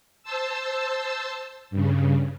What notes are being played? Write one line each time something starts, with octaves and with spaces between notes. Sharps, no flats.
C5 A5 E6
G2 C#3